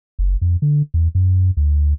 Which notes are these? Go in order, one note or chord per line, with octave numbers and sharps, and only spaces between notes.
F#1
F2
D3
E2
F#2
D2